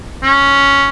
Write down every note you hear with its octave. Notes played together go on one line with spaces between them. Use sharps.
C#4